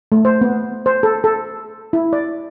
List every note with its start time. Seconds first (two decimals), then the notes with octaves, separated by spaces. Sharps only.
0.12 A3
0.25 C5
0.41 B3
0.86 C5
1.03 A4
1.24 A4
1.93 E4
2.13 D5